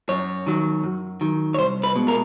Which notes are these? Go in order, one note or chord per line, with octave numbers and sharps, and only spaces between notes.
F#2 C#5
D#3 F#3
F#2
D#3 F#3
C#5
C2 C5
B4
B2 G#3
A#4